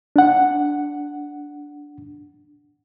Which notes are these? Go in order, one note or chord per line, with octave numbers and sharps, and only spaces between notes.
D4 F#5